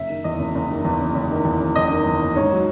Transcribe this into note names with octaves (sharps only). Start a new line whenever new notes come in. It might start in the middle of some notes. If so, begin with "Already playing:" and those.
Already playing: F#1 E5
D#3
E2 D#5
F#1
F#1
D#3
E2
F#1
F#1
D#3
E2
F#1
F#1 D#5
D#3
E2
F#1
G#2 C#5
F#3